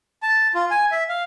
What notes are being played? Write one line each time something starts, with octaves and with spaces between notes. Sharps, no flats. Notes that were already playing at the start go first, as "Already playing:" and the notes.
A5
F4
G#5
E5
F5